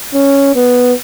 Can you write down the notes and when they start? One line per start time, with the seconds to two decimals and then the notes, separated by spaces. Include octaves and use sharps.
0.14 C#4
0.55 B3